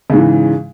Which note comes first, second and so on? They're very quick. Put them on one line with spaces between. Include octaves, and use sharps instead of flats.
C#3 G#2 E3